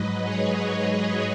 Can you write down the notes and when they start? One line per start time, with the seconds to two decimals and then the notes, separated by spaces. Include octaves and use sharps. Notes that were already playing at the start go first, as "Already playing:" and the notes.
Already playing: G#2 F#3 B4 D#5
0.24 G#4 C#5